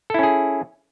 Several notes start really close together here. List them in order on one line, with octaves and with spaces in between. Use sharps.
A4 E4 C#4 G#4